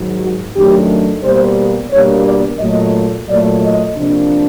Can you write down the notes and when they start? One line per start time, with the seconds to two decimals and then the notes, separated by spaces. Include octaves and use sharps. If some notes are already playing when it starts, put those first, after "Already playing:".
Already playing: G#2 D#3 F#3
0.20 F#4
0.55 F#2 D#3 F#3 A3 D4 G4
1.22 B2 G3 A#3 C5
1.91 B2 G3 A#3 D4 C#5
2.25 D5
2.59 A#2 F#3 A3 D#5
3.28 A#2 F#3 A3 D5
3.62 D#5
3.96 C3 F3 A#3 D4